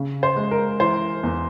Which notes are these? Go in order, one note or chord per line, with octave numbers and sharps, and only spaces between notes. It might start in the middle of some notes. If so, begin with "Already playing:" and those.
Already playing: C#3
C5
G#3
A#4
E3 C5
E2